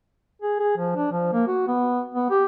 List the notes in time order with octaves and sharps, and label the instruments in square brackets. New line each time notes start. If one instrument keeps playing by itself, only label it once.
[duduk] G#4
G#4
F3
D4
F3
A#3
F#4
B3
B3
G4